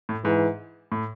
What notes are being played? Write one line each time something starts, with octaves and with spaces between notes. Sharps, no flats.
A2
G#2 E3
A2